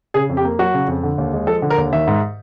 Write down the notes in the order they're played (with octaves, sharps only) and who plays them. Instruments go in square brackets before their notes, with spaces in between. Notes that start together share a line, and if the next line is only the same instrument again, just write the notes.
[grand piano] C#3 G#4
F2
G4
A#3
F#3 F#4
C#3
F2
D3
D#2
G#3
F3 A4
D3
A#4
D#2
D#3 E5
G#2